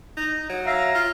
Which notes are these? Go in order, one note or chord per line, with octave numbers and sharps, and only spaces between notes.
D#4
F#3
E5 F5 A#5
F4